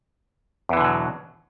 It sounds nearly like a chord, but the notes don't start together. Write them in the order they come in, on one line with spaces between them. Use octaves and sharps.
E2 E3 D3 B2 F#3